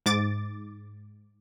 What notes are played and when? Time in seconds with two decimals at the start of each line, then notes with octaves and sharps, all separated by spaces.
0.06 G#2 D6 A6